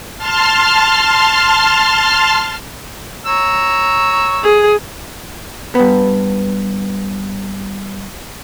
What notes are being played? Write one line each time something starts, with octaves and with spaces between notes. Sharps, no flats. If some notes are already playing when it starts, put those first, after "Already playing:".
A5 C6 F6
C#5 A#5 E6
G#4
G2 B3